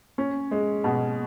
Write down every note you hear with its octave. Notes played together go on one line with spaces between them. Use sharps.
C#4
G#3
B2